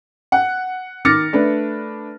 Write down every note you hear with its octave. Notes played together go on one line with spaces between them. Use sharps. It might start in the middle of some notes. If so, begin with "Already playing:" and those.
F#5
D#3 D6 F6 A6 A#6 C#7
A3 D4 B4